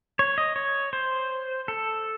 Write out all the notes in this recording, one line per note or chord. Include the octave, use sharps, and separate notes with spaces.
C#5
D#5
C#5
C5
A4